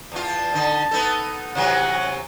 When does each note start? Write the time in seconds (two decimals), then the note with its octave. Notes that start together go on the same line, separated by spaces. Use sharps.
0.12 E2 F4 A5
0.54 D3 D#4
0.91 B3 D#4 A4
1.55 C3 E3 F#3 F#5